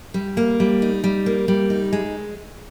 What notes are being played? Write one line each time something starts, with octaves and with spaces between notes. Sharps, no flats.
G3
A#3
G3
D#4
G3
A#3
G3
D#4
G#3